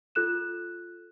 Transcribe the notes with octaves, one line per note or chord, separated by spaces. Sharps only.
F4 A4 F#6 E7